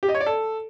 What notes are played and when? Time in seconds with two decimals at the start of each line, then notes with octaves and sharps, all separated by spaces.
0.03 G4
0.09 D#5
0.15 C#5
0.21 D5
0.26 A4